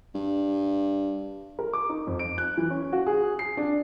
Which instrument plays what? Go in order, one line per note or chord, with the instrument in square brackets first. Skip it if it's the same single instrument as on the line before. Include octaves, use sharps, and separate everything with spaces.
[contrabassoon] G2
[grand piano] A#4
D6
D#4
F2
D7
F#6
E3
C#4
F#4
G#4
C7
D4